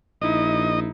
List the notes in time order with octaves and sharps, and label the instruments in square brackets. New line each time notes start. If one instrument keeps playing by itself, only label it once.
[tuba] A#1 [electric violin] D#4 E4 [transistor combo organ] D#5